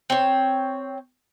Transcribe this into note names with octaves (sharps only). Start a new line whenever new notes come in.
C4 C#5